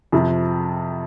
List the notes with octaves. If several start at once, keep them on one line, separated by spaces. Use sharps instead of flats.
F2 C3 F3